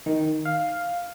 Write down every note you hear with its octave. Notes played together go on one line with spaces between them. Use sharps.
D#3
F5